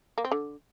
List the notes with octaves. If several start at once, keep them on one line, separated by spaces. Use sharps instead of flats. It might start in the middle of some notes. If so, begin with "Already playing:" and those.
A#3
C4
D3